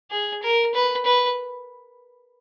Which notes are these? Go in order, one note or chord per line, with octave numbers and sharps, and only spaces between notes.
G#4
A#4
B4
B4